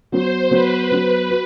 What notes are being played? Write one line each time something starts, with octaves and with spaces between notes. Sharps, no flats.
F#3 B3 F#4 C5
F#3 B3 F#4 B4
F#3 B3 F#4
F#4